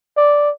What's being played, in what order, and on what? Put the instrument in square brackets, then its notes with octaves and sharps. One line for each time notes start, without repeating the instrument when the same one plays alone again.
[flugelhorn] D5